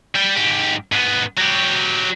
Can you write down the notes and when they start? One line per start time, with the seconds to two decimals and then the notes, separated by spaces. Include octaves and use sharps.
0.15 G3 G5
0.36 G#2 G4
0.92 G#2 B3
1.38 F#3 G4